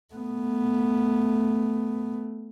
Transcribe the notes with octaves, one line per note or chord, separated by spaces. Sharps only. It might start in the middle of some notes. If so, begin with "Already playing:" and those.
A3 B3